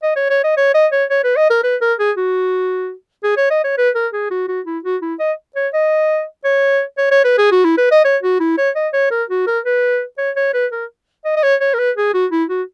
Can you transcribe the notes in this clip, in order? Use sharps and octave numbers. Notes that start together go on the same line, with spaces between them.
D#5
C#5
C#5
D#5
C#5
D#5
C#5
C#5
B4
D#5
A#4
B4
A#4
G#4
F#4
G#4
C#5
D#5
C#5
B4
A#4
G#4
F#4
F#4
E4
F#4
E4
D#5
C#5
D#5
C#5
C#5
C#5
B4
G#4
F#4
E4
B4
D#5
C#5
F#4
E4
C#5
D#5
C#5
A#4
F#4
A#4
B4
C#5
C#5
B4
A#4
D#5
D#5
C#5
C#5
A#4
B4
G#4
F#4
E4
F#4